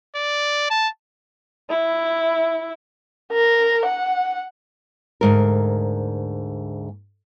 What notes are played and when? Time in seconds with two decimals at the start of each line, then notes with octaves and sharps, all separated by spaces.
0.16 D5
0.70 A5
1.70 E4
3.32 A#4
3.85 F#5
5.21 D2 G#2 A#4